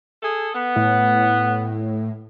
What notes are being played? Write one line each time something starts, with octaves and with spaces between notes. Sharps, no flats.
G#4 A4
B3
A2